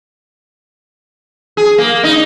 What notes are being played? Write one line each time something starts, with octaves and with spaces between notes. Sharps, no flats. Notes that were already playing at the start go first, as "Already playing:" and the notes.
G#4
A#3
D#4